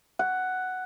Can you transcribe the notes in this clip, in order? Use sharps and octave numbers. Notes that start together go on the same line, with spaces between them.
F#5